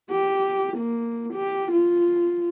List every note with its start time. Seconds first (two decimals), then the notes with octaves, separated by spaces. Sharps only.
0.10 G4
0.77 A#3
1.33 G4
1.71 F4